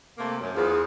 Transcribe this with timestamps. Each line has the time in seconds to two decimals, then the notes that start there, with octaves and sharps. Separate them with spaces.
0.18 C3 A3 A#3
0.40 F#2
0.56 E2 F3 G#4